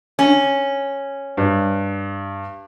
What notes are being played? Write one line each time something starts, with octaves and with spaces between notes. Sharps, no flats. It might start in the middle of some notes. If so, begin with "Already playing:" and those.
C#4
G2